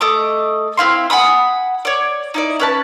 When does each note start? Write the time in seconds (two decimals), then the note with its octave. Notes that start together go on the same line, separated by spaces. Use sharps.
0.01 A3 D#5 D6
0.77 C4 E4 F5 C6
1.10 F#5 G#5 B5 D#6
1.85 C#5 D5
2.34 D#4 E4 D5
2.60 C#4 B4 A5